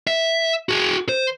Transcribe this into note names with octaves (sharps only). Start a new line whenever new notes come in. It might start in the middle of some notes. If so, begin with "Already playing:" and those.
E5
F#4 G#4
C5